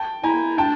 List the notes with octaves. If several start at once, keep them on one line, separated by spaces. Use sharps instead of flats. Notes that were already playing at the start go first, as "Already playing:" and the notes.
Already playing: G5 A5
E4 G#5 A#5
D4 G5 A5